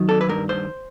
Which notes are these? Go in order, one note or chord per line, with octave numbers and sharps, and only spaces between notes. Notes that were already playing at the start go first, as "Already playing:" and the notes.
Already playing: D#3 F#3
A4
B4
G2 A#4
C5